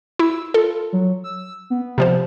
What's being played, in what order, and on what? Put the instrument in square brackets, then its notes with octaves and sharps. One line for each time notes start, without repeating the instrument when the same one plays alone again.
[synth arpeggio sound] E4 [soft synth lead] E6
[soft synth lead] F4 [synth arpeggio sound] A4
[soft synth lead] F#3
E6
B3
[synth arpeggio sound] C3 F3 C5